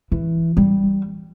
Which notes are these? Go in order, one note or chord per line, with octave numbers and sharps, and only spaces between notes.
E3
G3